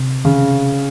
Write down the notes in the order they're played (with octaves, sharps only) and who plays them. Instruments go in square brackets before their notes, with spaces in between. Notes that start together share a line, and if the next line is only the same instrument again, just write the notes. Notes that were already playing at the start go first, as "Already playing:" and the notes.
Already playing: [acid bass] C3
[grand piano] C#3